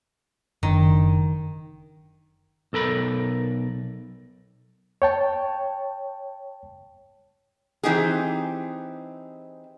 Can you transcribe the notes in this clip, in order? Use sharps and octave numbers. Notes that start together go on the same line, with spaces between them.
F#1 D#3 C#4 D4
B1 A4 A#4 B5
C#5 G5 A5
E3 C4 D#4 G4 G#4